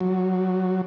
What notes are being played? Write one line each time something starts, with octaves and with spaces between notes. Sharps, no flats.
F#3